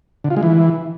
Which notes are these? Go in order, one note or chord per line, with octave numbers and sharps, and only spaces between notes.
D3
F4
G#3
E3